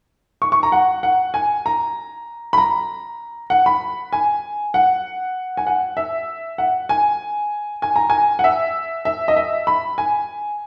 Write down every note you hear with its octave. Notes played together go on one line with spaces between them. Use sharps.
C#6
C#6
A#5
F#5
F#5
G#5
A#5
B5
A#5
F#5
B5
G#5
F#5
G#5
F#5
E5
F#5
G#5
G#5
A#5
G#5
F#5
E5
E5
D#5
E5
B5
G#5